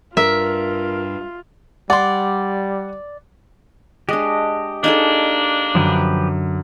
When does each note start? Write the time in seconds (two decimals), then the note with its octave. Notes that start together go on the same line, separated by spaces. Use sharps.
0.17 G2 F4 A#4 E5
1.90 G3 D5 F#5 C6
4.09 G#3 D4 G4 D#5
4.84 A#3 D4 D#4 G#4 A4
5.75 F#2 D3 F3 G4 B4